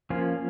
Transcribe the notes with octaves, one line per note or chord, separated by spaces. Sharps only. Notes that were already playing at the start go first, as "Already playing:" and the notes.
F3 A#3 C#4 F4